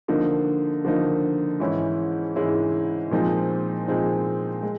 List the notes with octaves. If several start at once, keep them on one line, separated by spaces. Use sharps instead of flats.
D3 F3 A#3 D#4
D3 F3 A#3 D#4
G#2 E3 G#3 C#4 E4
G#2 E3 G#3 C#4 E4
A#2 F3 G#3 C4 D#4
A#2 F3 G#3 C4 D#4
G#3